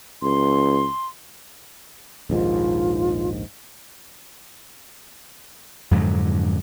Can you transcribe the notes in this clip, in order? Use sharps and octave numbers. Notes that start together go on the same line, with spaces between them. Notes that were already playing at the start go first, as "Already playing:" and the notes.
C#2 C6
A#1 D#2 G#2 F4
F2 G#2 D3 F#3